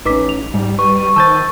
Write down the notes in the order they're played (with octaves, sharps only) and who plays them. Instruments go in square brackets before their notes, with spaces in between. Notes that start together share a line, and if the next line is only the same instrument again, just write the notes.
[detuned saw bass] A1 [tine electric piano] C#4 D#4 [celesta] B4 D6 B6
[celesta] F7
[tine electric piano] G#2 [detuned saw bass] G3
[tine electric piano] B4 [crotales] C#6
[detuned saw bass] D#3 [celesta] C5 A5 [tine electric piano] E6 G6 A6